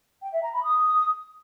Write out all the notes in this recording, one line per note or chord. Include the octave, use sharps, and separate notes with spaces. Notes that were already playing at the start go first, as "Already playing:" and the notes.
G5
E5
A#5
B5
D#6